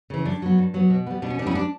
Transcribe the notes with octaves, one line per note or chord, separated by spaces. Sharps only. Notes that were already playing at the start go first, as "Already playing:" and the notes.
C#3 E3
G2 D4
F#3 B3
G2
F#3 B3
B2
G3 B3
B2 D4
C#4
G3 B3 C#4 D4 E4
D4